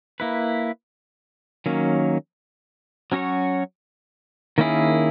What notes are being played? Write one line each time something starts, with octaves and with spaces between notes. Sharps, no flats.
A#3 E4 B4
D#3 F#3 A#3 C#4
F#3 C#4 F#4 C#5
D#3 A#3 C#4 E4 G#4